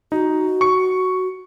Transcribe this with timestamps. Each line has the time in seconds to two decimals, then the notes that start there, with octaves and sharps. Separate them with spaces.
0.12 D#4 F#4
0.61 C#6 C#7